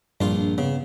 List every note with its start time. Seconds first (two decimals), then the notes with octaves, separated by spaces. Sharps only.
0.21 A#1 G2 F4
0.58 C#3 B3